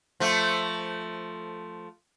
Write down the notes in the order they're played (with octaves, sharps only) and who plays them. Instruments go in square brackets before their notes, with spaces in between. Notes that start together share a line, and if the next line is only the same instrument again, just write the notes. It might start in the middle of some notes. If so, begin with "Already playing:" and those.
[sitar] F3 A3